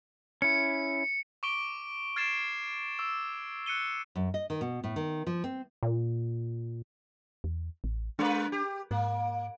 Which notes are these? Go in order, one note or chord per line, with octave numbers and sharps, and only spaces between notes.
C#4 E4 C#7
C#6 D6 D7 G7
F6 G#6 A6 C7 D7 E7
D6 E6
F#6 C#7 D#7 G7
F#2
D#5
D#3
B2
A2
D#3
F3
C4
A#2
E2
A1
G#3 A#3 D4 B4
G4
G#2 A#3